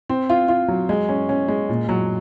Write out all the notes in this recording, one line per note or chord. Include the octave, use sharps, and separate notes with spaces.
C4
F4
F4
F#3
G#3
C#4
C#4
G#3
A#2
F#3